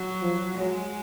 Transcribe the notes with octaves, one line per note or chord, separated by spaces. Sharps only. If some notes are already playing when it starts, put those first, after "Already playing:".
Already playing: F#3
F3
F#3 G#3